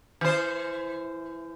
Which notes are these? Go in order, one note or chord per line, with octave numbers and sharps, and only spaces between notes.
E3 C5